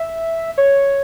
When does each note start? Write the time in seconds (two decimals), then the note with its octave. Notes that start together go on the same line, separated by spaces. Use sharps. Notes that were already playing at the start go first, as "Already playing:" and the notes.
Already playing: E5
0.58 C#5